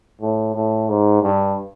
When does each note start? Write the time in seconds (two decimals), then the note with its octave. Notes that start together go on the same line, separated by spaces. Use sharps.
0.21 A2
0.55 A2
0.89 G#2
1.22 G2